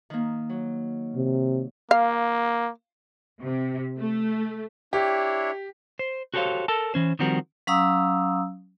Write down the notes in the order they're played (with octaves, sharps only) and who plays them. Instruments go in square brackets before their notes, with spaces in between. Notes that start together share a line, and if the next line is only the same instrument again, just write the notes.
[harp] D#3 A#3
F#3
[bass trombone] C3
[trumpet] A#3 [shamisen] F5
[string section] C3
A3
[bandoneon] D4 E4 C#5 [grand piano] G4
[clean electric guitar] C5
F#4 G4 A4 C5 C#5 F5
A4 A#4 A5
E3 C#4 C5
D#3 F3 G3 C4 F#4 A#4
[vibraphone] F#3 C#4 F5 A#5 D#6 E6